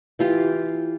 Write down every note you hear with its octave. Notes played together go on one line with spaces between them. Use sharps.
E3 F4 G4